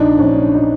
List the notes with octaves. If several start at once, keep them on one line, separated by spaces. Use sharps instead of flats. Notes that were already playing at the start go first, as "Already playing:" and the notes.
Already playing: A#1 D4 D#4
A#1 C#4
D#4